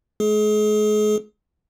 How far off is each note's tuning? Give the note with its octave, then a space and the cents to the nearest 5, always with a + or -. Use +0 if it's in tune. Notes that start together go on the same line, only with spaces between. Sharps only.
G#3 +40 G#4 +35